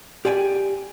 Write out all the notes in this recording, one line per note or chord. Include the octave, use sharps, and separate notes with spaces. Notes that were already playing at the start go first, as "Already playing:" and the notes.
G4 D5 G5 G#5